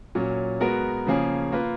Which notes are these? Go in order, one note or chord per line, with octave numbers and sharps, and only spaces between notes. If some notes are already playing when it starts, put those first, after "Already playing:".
A#2 F#3 C#4
G#3 B3 F#4 A#4
C#3 F3 A#3 C#4 G#4
A#3 F4 B4